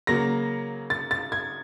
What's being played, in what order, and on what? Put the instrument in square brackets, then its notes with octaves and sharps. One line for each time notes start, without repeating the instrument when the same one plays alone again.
[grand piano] C#3 F#3 A#3 [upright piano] A#6
[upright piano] A6
A6
G#6